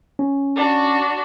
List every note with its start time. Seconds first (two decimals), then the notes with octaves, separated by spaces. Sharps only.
0.19 C#4
0.56 D4 F#4